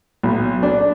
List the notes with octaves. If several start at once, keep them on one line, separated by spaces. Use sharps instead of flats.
B1
D4